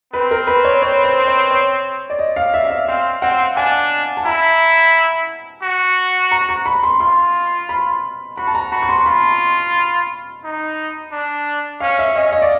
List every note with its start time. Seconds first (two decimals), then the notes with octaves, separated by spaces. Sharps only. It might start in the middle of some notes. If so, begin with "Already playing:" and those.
0.13 C4 B4
0.31 A#4
0.47 B4
0.64 C#5
0.82 C#5
1.04 C5
1.27 C#5
1.51 C#5
2.10 D5
2.19 D#5
2.36 F5
2.54 E5
2.65 F5
2.70 E5
2.88 C4 F5
3.22 C4 F#5
3.56 D4 G#5
4.17 A5
4.25 E4 A#5
5.63 F#4
6.32 A#5
6.49 C#6
6.66 B5
6.83 C6
7.00 F4 C6
7.69 B5
8.37 F#4 B5
8.47 A5
8.55 A#5
8.71 F#4 B5
8.82 C#6
8.89 C6
9.06 F4 B5
10.44 D#4
11.12 D4
11.80 C#4 F5
11.99 E5
12.15 C#4 D#5
12.32 D#5
12.42 D5